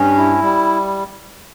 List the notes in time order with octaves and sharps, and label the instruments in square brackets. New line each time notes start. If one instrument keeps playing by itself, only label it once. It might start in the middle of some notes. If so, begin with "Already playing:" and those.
Already playing: [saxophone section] G2 [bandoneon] C#4
[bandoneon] E4
G3